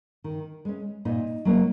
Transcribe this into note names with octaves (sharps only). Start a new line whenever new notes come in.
D#3
G#3 C#4
A#2 D#4
F#3 A#3 C#4